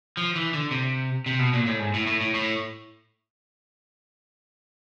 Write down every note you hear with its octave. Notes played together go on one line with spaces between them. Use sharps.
F3
E3
D3
C3
C3
B2
A#2
A2
G#2
A2
A2
A2
A2